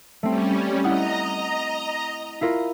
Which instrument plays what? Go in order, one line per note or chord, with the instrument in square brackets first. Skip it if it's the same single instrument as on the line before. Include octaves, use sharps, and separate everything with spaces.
[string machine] G3 C#4 [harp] A3 C4
[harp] E4 F#5 D#6 [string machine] D#5 A#5
[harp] E4 F4 A#4